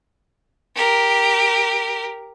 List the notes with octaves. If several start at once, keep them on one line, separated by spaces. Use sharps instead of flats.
G4 A#4